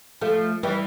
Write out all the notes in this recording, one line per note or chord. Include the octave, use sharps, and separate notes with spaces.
F3 A3
E3 G3